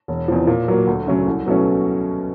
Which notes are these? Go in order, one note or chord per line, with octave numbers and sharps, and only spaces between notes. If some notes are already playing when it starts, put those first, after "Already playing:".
E1
E2 C3 F3
A#2
F#3 A#3
D2
C#3 F#3 A3 C#4
C2
B2 F#3 A3 C#4